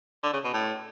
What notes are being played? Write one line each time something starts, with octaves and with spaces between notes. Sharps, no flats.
D3
C#3
B2
A2